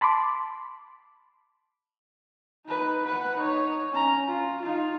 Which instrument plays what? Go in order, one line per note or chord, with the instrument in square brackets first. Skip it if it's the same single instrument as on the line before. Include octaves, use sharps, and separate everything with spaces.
[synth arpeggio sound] A5 B5 C6 D6
[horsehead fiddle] D#4 B4
B4 F#5
D#4 C#5
C#4 A#5
F4
D#4 F4